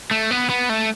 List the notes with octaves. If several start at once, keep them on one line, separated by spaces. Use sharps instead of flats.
A3
B3
B3
A3